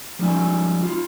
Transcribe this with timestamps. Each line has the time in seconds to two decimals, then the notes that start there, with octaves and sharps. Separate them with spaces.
0.19 F3 G3 G#3 D#4 G#5
0.83 D#4 F4